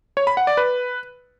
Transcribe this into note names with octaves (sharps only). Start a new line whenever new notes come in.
C#5
B5
F#5
D5
B4